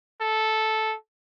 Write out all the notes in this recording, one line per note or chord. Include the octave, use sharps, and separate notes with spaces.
A4